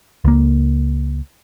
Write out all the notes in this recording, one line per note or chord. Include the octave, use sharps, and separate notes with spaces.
C#2 A#3